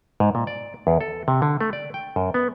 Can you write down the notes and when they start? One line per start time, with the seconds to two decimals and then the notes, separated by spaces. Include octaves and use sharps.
0.20 G#2
0.35 A#2
0.47 D5
0.87 E2
1.01 A4
1.28 C3
1.42 D3
1.61 A3
1.73 D5
1.94 G5
2.16 F#2
2.34 B3